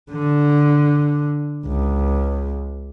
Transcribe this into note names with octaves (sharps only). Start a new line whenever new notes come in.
D3
C#2